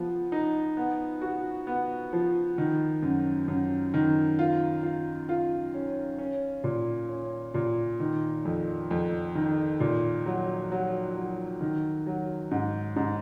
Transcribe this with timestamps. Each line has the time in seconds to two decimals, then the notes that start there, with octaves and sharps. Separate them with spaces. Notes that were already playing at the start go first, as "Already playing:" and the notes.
Already playing: F3 B3
0.32 D#4
0.77 B3
1.22 F#4
1.67 B3
2.13 F3
2.58 D#3
3.02 F#2
3.48 F#2
3.94 D#3
4.39 F4
4.83 F4
5.29 F4
5.74 C#4
6.19 C#4
6.64 A#2
7.09 C#4
7.54 A#2
8.00 D#3
8.45 F2
8.91 F2
9.35 D#3
9.80 A#2
10.26 F#3
10.72 F#3
11.16 F#3
11.61 D#3
12.07 F#3
12.51 G#2
12.96 G#2